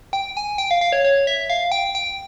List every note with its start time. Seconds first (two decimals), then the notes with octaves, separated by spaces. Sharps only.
0.13 G5
0.37 G#5
0.58 G5
0.71 F5
0.81 F5
0.92 C#5
1.04 C#5
1.27 E5
1.50 F5
1.72 G5
1.95 G5